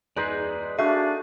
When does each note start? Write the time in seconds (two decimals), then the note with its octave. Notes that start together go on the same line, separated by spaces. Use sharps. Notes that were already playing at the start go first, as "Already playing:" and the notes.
0.16 G#3 D#4 G#4 B4 D5
0.79 A3 D4 F#4 G#4 E5 F5